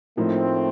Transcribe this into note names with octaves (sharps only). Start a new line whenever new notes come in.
A2 F3 A3 A#3 C4 D#4